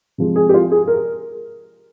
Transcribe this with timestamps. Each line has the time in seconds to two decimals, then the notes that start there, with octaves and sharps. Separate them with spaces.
0.18 C3 F3 G#3
0.36 G#4
0.49 G4
0.54 F4
0.71 G#4
0.88 A#4